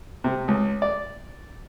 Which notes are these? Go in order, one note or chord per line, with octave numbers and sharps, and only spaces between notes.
C3
C#2
D5